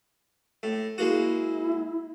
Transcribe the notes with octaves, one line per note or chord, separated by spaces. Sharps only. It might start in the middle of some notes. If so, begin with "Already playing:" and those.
A2
G#3 A#3 E4 F#4